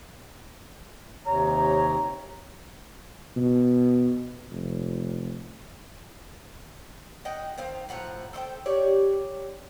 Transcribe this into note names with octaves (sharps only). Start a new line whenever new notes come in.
D#2 C3 C#5 A#5
B2
F1
D#5 F#5 G5
D#3 C4 F5
A2 F3 F#5 A#5
A4 C5 D#5 G5
G4 C#5 D5